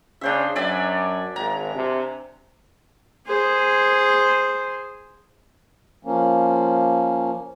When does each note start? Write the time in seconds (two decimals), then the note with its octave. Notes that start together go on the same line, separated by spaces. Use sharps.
0.21 C#3 D4 C5 E5
0.56 F#2 D5 E5 G#5
1.36 G#1 A#5
1.75 C3
3.27 G#4 C5
6.05 F3 A#3 C#4